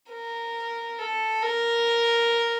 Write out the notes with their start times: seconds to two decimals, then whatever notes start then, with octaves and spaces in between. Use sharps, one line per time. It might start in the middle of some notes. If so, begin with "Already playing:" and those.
0.11 A#4
0.98 A4
1.42 A#4